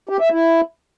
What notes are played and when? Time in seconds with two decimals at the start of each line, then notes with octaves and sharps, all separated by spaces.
0.09 G4
0.20 E5
0.32 E4